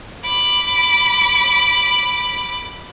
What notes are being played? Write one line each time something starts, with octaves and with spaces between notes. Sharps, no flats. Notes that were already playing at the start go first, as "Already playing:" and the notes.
B5 D6